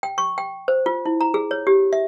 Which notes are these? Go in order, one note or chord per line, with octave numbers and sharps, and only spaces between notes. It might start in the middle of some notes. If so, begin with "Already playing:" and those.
G5
C#6
G5
C5
F4
E4
A#5
G#4
C#5
G4
E5